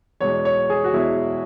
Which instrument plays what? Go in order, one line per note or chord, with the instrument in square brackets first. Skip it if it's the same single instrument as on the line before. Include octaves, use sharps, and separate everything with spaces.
[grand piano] E2 B2 G#3 C#5
C#5
G#4
F#4
E2 B2 G#3 E4